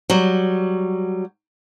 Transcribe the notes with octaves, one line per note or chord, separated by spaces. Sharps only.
F#3 G3